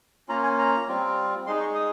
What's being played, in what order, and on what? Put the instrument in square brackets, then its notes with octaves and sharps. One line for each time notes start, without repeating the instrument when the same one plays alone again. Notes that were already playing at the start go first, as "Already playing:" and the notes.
[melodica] A#3 C#4 F4 A#5
G#5
A#5
G3 C4 F4
G#3 D#4 C6
C#6
D#6